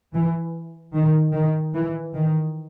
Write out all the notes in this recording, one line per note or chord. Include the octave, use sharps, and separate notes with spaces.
E3
D#3
D#3
E3
D#3